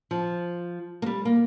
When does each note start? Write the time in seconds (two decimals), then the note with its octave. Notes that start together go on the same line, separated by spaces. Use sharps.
0.11 F3
1.02 A#3
1.06 G3
1.25 A#3